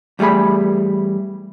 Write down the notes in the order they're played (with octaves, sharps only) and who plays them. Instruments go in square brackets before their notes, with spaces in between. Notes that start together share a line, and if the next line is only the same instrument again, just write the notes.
[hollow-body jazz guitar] E2 G3 A3 G#4 B5